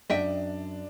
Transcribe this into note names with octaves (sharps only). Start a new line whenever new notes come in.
F#2 D4 D#5 E5 G5